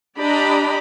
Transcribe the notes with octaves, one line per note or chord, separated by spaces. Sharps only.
D4 G4 D5 D#5 A#5 B5